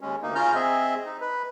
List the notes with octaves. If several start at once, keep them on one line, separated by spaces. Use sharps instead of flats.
D#2 G#3 C#4
D2 A#3 D#4
C#3 C#4 F4 A#5 F6 G6
C4 G#4 D#5 E5
D#4
B4